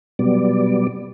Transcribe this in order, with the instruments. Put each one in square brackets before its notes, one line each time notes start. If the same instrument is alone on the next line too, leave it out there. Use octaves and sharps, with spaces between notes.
[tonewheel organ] B2 F#3 G3 B3 D5